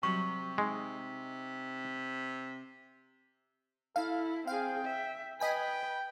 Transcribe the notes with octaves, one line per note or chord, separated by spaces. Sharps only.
C3 F#3 G3 C#6
G#3 D#4
E4 A4 F5
C4 G#4 F5 G5
E5
B4 D#5 G5 G#5 B6